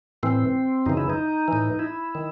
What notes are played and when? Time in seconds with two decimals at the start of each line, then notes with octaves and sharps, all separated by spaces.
0.23 A2 E3 C4
0.86 F#2 C#3 E3 D#4
0.97 E4
1.10 D#4
1.48 A2 E3
1.79 E4
2.15 D#3